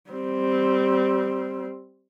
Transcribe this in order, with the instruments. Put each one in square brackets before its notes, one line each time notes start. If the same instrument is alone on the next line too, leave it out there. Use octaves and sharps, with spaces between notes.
[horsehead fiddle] G3 C4